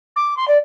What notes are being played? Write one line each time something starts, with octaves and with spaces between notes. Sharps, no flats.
D6
C6
D5